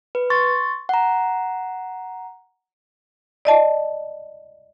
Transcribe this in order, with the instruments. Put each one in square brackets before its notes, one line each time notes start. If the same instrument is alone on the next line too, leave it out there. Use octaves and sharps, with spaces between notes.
[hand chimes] B4
C6 C#6 A6
F#5 A#5
[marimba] D5 D#5 A5